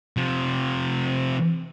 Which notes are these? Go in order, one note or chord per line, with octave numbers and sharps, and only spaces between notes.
C3 F3